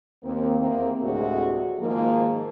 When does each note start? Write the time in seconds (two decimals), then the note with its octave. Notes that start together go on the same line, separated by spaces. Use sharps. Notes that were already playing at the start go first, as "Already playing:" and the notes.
0.23 D#2 A#3 C4
0.60 E2 A#3 C4
1.01 D2 A2 C3 G#3 F#4 G#4
1.79 G#2 D#3 F3 A#3